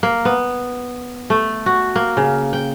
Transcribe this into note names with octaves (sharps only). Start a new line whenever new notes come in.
A#3
B3
A3
F#4
A#3
C#3
G5